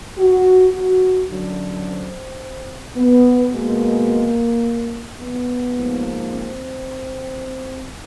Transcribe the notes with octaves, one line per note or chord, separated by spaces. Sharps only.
F#4
F#4
F#2 D3 F#3
C4
B3
B2 G#3 A#3
B3
G#2 F3 A#3
C4